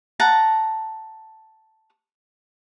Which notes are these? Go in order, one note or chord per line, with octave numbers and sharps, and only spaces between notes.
F#5 A5 A#5